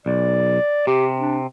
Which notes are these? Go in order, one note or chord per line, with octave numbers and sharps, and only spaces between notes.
B1 D5
C3 G4
D4